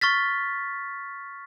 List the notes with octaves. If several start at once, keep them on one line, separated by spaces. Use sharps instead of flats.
C#6 F6 A6 B6